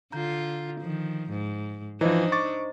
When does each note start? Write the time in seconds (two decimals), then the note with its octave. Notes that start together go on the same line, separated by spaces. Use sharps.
0.12 D3 F4 A#5 G6
0.81 D#3 F3
1.30 G#2
2.01 E3 F3 D4 D#4 C5 D#5 A#5
2.32 C#6 D6 A6